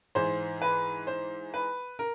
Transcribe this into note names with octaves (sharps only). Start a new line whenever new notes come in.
G#2 E3 C5
B4
C5
B4
A#4